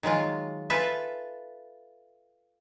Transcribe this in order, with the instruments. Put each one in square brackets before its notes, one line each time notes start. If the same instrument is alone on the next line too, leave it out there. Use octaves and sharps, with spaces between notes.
[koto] D#3 F#3 G#3 F4
F4 A4 B4 E5 G#5